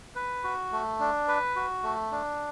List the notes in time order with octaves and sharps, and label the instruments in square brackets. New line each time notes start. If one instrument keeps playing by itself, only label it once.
[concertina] B4
F#4
A3
D4
B4
F#4
A3
D4